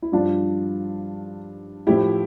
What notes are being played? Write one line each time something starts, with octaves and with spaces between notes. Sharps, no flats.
E4
G2 F3 D4 F4
A2 F3 E4 G4